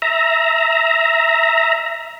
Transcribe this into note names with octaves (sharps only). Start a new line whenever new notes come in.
E5 A#5